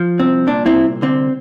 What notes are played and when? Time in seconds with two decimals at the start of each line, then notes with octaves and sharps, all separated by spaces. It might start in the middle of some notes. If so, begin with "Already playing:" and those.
Already playing: F3
0.19 C2 C4
0.47 A#2 D4
0.66 C4 E4
0.75 C2
1.02 D3 C4